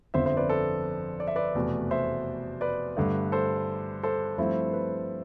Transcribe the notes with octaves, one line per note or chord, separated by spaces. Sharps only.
G1 F2 D3 F3 C5 E5
C5 E5
B4 D5
A4 C5
D5
E5
B4 D5
F1 E2 B2 A3
C5 E5
B4 D5
G2 D3 A3
A4 C5
A4 C5
G2 F3 A3 C4 E4
B4